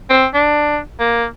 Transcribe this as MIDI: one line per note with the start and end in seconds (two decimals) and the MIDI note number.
0.10 0.27 60
0.34 0.79 62
1.00 1.25 58